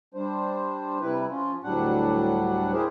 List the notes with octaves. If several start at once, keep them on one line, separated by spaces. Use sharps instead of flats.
G3 D4 C5
C3 G3 E4 B4
F3 C#4 F4
D2 A2 F#3 G3 D4 F#5
E4 G4 G#4 A#4 C5